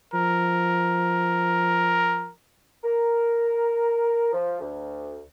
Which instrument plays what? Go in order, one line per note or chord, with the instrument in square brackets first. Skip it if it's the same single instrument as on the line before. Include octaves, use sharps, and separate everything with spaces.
[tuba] F3 [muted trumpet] A#4
[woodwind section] A#4
F3
D2